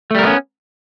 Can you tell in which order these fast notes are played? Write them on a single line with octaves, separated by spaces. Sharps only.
A3 G3 A#4 B3 C#4